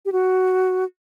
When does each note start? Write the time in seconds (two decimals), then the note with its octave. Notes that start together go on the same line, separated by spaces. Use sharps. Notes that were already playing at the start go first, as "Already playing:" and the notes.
0.05 G4
0.12 F#4